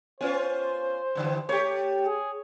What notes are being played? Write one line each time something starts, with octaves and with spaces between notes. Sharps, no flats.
B3 C#4 F4 C5 G#5
G2 D3 E3
A3 G4 C#5
G#4